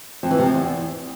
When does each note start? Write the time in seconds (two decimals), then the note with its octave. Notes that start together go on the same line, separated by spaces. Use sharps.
0.23 F2
0.31 E3
0.38 C3
0.46 F2
0.54 E2